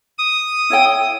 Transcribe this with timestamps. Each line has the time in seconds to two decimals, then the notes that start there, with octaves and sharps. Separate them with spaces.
0.18 D#6
0.70 E4 C#5 G5